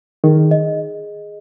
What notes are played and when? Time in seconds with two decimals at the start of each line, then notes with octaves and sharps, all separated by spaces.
0.24 D#3 G#4
0.51 D#5